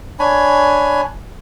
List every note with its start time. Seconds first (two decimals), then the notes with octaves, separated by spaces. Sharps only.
0.19 D4 C#5 G#5 B5